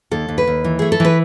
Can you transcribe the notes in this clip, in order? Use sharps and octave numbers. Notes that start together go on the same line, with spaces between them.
D#2 A4
D#2
B4
D#2
E3
A3 G#4
A4
E3 B4